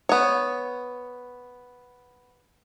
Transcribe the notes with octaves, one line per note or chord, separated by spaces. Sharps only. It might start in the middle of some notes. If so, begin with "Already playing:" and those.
B3 C#5